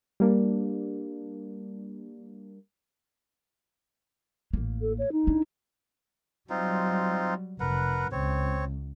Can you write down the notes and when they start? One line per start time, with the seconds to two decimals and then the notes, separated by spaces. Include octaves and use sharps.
0.20 G3 A#3 D4
4.53 A1 A#3
4.81 A4
4.99 C#5
5.12 D#4
5.27 D4 E4
6.50 F#3 G3 C4 D#4 F4
7.60 F1 A#4 B4 F#5
8.12 C#2 C4 C#5